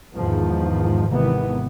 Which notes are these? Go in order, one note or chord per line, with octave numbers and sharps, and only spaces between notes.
E2 G#2 D#3 F3
G#1 C3 D#3 E3 B3